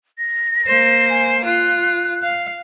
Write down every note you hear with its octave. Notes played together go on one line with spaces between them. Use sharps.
A#6
A#3 C5
G#5
F4 F#6
F5